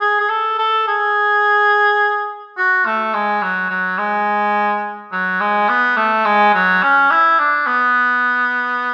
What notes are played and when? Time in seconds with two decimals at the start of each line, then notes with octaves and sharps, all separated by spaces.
0.01 G#4
0.20 G#4
0.30 A4
0.58 A4
0.87 G#4
2.57 F#4
2.86 A3
3.14 G#3
3.42 F#3
3.70 F#3
3.98 G#3
5.12 F#3
5.40 G#3
5.69 B3
5.97 A3
6.25 G#3
6.54 F#3
6.82 C#4
7.11 E4
7.39 D4
7.66 B3